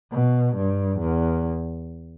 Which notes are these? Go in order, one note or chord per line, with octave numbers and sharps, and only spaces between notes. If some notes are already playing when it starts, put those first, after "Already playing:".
B2
G2
E2